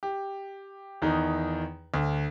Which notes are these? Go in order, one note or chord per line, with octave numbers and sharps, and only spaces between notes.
G4
E2 D#3 D#4
D2